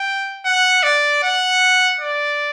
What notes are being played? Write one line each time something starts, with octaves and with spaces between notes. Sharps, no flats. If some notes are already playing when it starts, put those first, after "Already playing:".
Already playing: G5
F#5
D5
F#5
D5